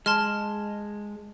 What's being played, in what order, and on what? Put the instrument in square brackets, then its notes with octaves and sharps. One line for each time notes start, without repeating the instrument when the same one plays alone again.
[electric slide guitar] G#3 [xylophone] A5 C6 F6